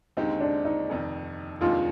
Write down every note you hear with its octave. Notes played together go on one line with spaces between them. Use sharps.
D#2 D3 G#3 C4 D#4 G4
D4
D#4
F1 F2 D#3
F1 D#2 D#3 G#3 D4 F4